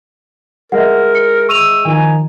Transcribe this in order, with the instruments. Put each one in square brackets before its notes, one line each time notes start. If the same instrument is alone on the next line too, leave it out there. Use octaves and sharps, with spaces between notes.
[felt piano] G#3 D#5 E5 [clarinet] A#4 [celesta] F#5
[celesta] C#7
[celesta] C#6 D#7 F7 [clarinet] E6
[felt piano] D#3 F3 D#4 [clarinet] G#5